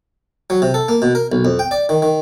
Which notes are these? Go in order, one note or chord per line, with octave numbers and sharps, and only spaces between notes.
F#3
C3
A4
A#3
B2
A#4
B1
F2
G5
D5
D#3
D#3